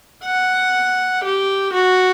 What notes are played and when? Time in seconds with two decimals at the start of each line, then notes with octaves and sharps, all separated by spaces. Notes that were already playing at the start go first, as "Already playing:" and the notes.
0.24 F#5
1.24 G4
1.74 F#4